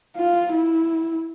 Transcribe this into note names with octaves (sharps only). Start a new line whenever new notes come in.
F4
E4